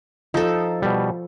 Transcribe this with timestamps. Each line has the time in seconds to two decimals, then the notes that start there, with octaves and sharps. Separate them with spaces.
0.34 F3 D#4 A4
0.82 B2 G3